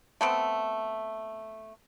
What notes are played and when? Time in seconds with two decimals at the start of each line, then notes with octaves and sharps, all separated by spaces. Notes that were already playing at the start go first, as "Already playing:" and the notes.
0.21 A3 B3 C4